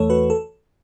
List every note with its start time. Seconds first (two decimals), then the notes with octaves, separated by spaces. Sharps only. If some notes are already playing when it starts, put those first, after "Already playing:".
Already playing: E2 E3 A3 A4 C#5
0.10 F#4 B4
0.30 A4